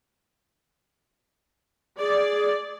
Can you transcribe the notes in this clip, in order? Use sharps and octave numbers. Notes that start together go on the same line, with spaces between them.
G#4 D5